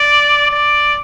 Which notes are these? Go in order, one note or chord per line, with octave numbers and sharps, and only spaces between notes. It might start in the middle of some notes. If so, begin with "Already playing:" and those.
Already playing: D5
D5